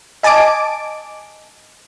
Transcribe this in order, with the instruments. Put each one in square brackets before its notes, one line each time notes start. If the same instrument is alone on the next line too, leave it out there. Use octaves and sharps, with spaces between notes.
[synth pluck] D#5 G#5 A5 D6 D7